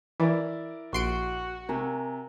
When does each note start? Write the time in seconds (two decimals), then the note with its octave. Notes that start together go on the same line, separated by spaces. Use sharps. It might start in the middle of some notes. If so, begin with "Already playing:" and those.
0.20 E3 E4 A#4 D5
0.93 A#1 F#4 C6 C#6 D7
1.69 C3 A#4 G#5 A#5